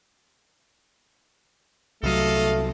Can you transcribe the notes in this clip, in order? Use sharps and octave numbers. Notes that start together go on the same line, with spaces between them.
C2 F#3 A3 A4 D#5 F5